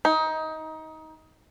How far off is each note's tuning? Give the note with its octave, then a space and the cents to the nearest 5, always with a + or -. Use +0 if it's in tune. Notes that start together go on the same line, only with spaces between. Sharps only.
D#4 +20